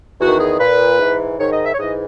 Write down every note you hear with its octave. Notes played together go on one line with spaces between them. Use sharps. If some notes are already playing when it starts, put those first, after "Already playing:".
E2 D#3 F#4
G#4
A#2 B4
G#2 E3
G#2 D#3 C#5
D#5
E5
C#5
G#2 E3 D#5